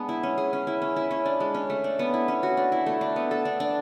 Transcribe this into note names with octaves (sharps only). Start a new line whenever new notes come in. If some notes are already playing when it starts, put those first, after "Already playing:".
Already playing: G#3 B3 D4
E4
C#4
G#4
C#4
E4
C#4
E4
C#4
D4
G#3
C#4
A3
D4
B3
E4
C#4
F#4
D4
E4
A3
D4
B3
A4
D4
D4